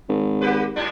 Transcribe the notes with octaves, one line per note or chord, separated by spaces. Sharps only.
G#1
A#3 G4 B4
G#2 G3 D4